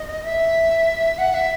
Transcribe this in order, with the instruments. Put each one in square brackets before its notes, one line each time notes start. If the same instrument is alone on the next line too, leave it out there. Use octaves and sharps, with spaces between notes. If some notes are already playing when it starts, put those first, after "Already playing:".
Already playing: [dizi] D#5
E5
F#5
E5